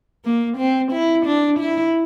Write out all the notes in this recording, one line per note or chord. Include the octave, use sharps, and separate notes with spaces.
A#3
C4
E4
D4
E4